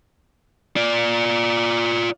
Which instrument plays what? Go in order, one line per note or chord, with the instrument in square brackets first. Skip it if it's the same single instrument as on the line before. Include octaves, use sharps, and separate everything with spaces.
[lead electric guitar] F4 D5